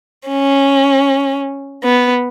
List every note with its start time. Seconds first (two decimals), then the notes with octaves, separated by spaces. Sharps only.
0.29 C#4
1.84 B3